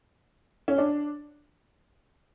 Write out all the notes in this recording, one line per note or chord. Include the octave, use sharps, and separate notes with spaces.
C#4
D4